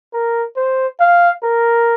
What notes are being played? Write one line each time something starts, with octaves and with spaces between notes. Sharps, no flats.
A#4
C5
F5
A#4